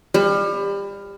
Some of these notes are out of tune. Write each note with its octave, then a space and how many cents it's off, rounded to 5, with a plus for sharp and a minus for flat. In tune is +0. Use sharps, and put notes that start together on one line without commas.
G3 +30